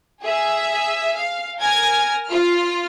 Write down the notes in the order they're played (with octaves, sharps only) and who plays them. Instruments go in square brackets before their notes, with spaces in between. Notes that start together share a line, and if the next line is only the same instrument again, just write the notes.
[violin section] G#4 E5
F5
A#4 G#5 F6 G#6 A#6
F4 F6